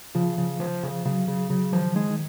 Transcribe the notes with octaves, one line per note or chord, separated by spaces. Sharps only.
C#3 F3
C#3
F3
C#3
C#3 F#3
C#3
C#3 F#3
D#3 F3
D#3 G#3
D#3